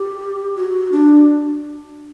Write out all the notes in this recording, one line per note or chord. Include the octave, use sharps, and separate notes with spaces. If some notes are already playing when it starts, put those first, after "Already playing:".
Already playing: G4
F#4
D4